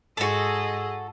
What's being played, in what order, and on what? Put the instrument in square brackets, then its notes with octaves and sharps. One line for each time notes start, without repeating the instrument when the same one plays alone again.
[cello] G#2 [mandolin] F#4 A4 [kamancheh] G#4 D#5